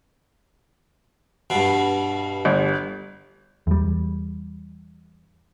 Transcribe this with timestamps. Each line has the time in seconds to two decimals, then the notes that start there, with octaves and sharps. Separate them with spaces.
1.50 G2 B2
2.45 G1
3.67 E2 G3